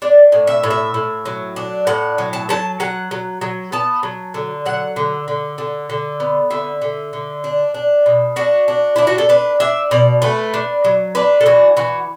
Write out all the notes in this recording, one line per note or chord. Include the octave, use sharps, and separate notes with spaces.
D4 D5
A2
E5
A2
E5
A2
F#3
D4
A2 F#5
F#3
A5
F#3 A5
F#3 F#5
F#3
F#3
B3 A5
F#3
D3
F#3 F#5
D3
D3
D3
D3
B3
D3 E5
D3
D3
D4
D4
B2
D4 F#4
D4
D4 E4
F#4
A4
D4 B4
D4 E5
B2 D5
A3 B4
D4
F#3
D4 B4
A4
E3 F#4
E3 F#4